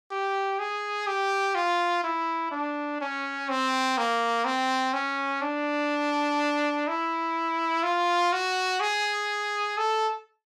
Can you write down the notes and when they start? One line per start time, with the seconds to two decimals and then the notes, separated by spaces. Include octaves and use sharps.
0.11 G4
0.59 G#4
1.07 G4
1.55 F4
2.03 E4
2.52 D4
3.01 C#4
3.49 C4
3.98 A#3
4.45 C4
4.93 C#4
5.42 D4
6.88 E4
7.83 F4
8.33 F#4
8.81 G#4
9.78 A4